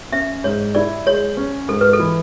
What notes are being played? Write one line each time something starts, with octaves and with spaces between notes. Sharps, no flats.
C#4 E5
G#2 C#5
E4 D5
G#3 C#5
C#4
G#2 A4
B4
A4
E3